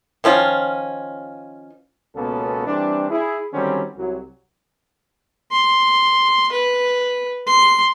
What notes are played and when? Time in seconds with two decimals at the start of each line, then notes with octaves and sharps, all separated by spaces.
0.24 D#3 F3 C#4 F4
2.15 C#2 B2 A#3 B3 C#4 A4
2.67 E3 G3 C4 D4
3.10 E4 G#4
3.53 D3 D#3 F#3 G3 C4 C#4
3.97 C2 F#3
5.52 C6
6.52 B4
7.47 C6